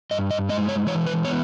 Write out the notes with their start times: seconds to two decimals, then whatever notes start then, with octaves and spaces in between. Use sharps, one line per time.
0.11 G2 D#5
0.31 D#5
0.49 G#3 D#5
0.69 C#5
0.87 E3 C#5
1.06 B4
1.25 B3 C#5